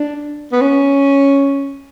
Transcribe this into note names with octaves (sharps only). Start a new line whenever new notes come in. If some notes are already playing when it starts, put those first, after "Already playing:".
Already playing: D4
B3
C#4